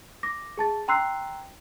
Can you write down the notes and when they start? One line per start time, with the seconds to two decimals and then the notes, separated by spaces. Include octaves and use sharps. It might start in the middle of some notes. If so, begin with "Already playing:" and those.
0.23 D6 A#6
0.57 G#4 A5 A6
0.88 G5 A#5 C6 E6 F#6 C7